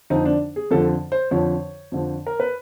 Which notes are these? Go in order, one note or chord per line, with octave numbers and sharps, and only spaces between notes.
F2 D3 F3 D#4
D4
G#4
F2 D3 F3 A4
C5
F2 D3 F3 C#5
F2 D3 F3
A#4
B4